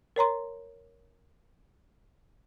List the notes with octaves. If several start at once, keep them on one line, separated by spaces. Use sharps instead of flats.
A#4 C#5 A#5 C6